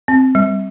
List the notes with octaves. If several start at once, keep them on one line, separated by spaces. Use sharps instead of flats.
C4
G3